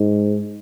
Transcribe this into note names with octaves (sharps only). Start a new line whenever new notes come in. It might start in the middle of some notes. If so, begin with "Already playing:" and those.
Already playing: G#2